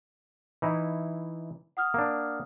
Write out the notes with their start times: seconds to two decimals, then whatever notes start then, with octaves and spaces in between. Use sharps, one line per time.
0.62 E3 D#4 E4
1.77 F#5 D#6 F6
1.94 A#3 D4